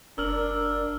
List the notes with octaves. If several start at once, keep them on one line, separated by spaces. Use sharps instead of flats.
F#1 D4 A#4 E6 F6 F#7